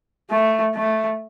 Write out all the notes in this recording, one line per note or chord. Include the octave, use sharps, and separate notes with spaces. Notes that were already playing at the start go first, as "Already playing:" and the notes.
A3
A3